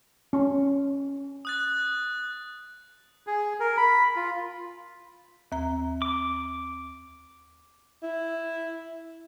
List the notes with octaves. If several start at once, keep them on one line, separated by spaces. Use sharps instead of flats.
C#4
D#6 F#6 A6
G#4
A#4
B5
F4
D#2 A#5
D6
E4